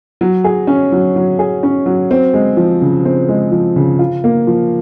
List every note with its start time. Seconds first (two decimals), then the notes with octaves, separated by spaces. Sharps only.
0.21 F#3
0.44 G#4
0.67 C#4
0.92 F#3
1.16 F#3
1.39 G#4
1.63 C#4
1.86 F#3
2.11 C4
2.34 G#3
2.57 F3
2.82 C#3
3.05 C4
3.29 G#3
3.52 F3
3.76 C#3
3.99 F4
4.24 A#3
4.47 F3